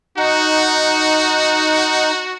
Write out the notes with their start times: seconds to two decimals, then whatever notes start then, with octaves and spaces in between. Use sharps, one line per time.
0.17 D#4 F#4 F#5